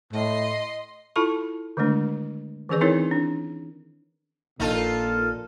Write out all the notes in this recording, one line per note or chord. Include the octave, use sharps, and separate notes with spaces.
A2 D#5 C6
E4 F4 A4 A5 B5 C#6
D3 D#3 G#3 A3 D4
D#3 E3 C#4 G#4 B4 D5
C4 D#4 E4 G#4 A#4 C#5
D4
A#1 A#2 D#4 F4 A4